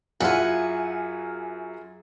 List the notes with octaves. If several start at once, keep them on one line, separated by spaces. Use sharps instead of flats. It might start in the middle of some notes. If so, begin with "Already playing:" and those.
F#2 E4 F4 G#4 F#5